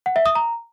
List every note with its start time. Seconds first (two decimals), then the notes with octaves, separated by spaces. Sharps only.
0.06 F#5
0.16 E5
0.26 D#6
0.35 A#5